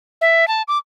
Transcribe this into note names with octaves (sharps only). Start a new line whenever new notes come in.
E5
A5
D6